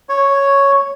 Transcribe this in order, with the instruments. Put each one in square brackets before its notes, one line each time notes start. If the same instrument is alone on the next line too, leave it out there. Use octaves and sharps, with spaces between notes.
[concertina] C#5